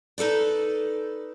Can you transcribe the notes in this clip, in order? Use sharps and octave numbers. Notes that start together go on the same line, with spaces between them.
D#4 A4 B4 D5